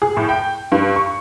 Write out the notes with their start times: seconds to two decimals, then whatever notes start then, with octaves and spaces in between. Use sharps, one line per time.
0.02 G#4
0.17 A2
0.29 G5
0.72 G2
0.96 C#6